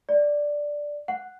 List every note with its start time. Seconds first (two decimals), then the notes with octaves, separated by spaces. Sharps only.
0.09 D5
1.08 F#5